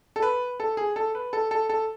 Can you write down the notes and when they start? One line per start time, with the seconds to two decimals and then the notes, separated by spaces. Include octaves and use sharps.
0.16 A4
0.22 B4
0.60 A4
0.77 G#4
0.96 A4
1.15 B4
1.33 A4
1.51 A4
1.69 A4